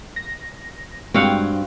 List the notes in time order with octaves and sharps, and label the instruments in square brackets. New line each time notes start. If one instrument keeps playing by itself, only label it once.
[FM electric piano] A#6
[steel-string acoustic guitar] G2 C4 [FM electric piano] G3 G#3 [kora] F#4 F5 F#5